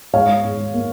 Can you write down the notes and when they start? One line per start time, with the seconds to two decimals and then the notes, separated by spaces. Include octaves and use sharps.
0.13 G#2 C#5 F5
0.44 G#2
0.74 A#3